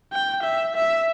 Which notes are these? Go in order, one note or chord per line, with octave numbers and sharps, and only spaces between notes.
G5
E5
E5